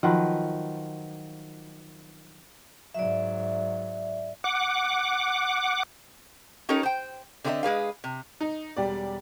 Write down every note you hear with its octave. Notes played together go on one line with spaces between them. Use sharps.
D#3 F3 F#3 B4
G#2 F#3 D5 E5
F#5 D6
C#4 D#4 G4 A4 A#4 C#5
C5 G5
D3 C4 E4 G#4 D#5 E5
G#3 G#4 B4 F5
C3
D#4
E1 G3 G4 D5